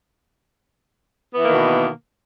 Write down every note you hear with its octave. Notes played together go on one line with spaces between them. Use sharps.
B2 D#3 E3 A#3 B3